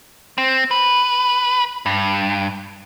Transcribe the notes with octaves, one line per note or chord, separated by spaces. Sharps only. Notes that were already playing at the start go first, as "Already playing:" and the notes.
C4
B4
G2